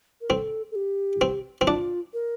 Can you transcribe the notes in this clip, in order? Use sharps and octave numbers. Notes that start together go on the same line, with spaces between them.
A#4
C4 A4
A4
G4
C4
C4
D4 F4
A#4